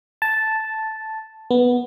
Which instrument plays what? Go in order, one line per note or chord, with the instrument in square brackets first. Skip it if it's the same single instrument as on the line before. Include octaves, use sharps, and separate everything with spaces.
[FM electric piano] A5
B3